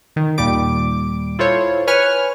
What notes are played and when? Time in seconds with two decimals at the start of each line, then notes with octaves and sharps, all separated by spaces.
0.16 D#3
0.38 D#2 A#2 G3 D6 D7
1.39 E4 F4 A4 C5 C#5
1.87 B4 C#5 G#5 F6